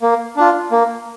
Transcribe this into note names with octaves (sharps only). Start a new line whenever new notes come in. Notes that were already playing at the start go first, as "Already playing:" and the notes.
A#3
D4 F4
A#3